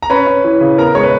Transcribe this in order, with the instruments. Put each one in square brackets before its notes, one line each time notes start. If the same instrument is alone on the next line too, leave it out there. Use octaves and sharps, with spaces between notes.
[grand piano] A#5
C#4 B4 B5
C#4
E3
C#3
B3 A#4 A#5
G#3 C#5 C#6
B4